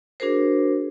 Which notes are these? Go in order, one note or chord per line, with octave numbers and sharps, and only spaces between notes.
D4 F#4 G#4 A#4 C5